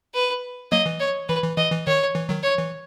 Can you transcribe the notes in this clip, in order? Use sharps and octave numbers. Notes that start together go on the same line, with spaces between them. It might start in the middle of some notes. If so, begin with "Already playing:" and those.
B4
F#3 A#3 D#5
E3
C#5
E3 B4
E3
E3 D#5
E3
D#3 C#5
E3
D#3 F#3
C#5
E3